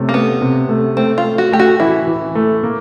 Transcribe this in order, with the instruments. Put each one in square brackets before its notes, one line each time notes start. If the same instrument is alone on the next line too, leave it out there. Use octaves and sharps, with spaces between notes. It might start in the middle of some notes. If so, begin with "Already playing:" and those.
Already playing: [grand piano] C3 A3 C#4
[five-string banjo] A#3
[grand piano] A3 [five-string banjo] B3
[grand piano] C3
A3
[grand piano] A3 [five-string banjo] C4
[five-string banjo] F4
[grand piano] A3
[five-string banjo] F#4
[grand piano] A3 [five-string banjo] G4
[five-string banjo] F#4
[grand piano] E3 [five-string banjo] E4
[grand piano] E3
A3
A#3